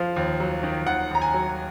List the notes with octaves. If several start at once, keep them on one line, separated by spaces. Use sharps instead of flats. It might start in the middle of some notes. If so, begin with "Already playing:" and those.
Already playing: F3 F5
D#2
F#3
D#3
D#2 F#5
D#2 A#5
G#5
F#3